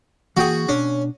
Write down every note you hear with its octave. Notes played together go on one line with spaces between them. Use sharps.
E3 A#3 F#4 G#4 G5
B2 C#4 D4